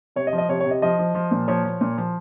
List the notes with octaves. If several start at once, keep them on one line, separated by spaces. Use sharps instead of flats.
C3 C#5
D#5
F3
D#5
C3 C#5
C#5
C3
D#5
F3 D#5
F3
F3
A#2
F3 C#5
F3
A#2
F3